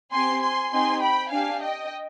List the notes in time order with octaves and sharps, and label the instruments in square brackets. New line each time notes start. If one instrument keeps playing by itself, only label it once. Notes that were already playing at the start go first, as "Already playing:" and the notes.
[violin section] C4 G4 G#5 C6
G#5 C6
C4 D#4 G4 G#5 C6
G5 B5
D4 G4 F5 G#5
D#5 G5